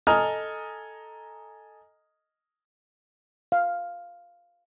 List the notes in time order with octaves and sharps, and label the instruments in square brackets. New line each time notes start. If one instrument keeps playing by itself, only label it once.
[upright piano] A4 D#5 G#5 A#5 D#6 F6
[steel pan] F5